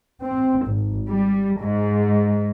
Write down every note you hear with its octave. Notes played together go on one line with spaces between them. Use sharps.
C4
G#1
G3
G#2